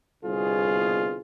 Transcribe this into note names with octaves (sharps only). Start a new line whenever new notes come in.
G1 C2 B2 F4 G#4